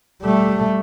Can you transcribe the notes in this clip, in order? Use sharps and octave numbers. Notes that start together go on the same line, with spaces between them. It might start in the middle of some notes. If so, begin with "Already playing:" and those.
G3 A3